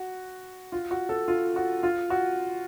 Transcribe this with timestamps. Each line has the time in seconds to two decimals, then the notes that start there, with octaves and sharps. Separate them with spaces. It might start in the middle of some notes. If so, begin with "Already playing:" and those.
Already playing: F#4
0.72 F4
0.91 F#4
1.09 A4
1.28 F4
1.56 F#4
1.83 F4
2.10 F#4